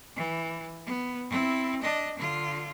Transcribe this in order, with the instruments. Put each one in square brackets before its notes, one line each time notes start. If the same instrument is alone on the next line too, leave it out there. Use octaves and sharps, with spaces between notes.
[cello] E3
B3
C4 E4
D4 D#5
D3 F4